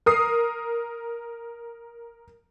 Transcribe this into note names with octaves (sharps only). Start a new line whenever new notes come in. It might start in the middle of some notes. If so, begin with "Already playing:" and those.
A#4 D#6 C7